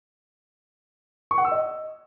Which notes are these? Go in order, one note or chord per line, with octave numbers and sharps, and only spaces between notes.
C#6
F#5
E6
D#5